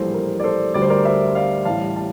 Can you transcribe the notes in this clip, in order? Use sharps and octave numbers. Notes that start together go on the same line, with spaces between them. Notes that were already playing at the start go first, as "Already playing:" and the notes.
Already playing: A#1 A2 E3 G3 A4 C5
A#4
D5
A4 C5
D2 D3 G3 D5
C5
A#4 D5
C5 E5
D5 F5
A1 A2 G3 F5 A5
F5 A5